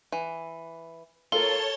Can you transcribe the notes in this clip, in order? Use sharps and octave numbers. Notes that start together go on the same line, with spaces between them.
E3
F4 A4 A#4 C#5 A5 A6 G7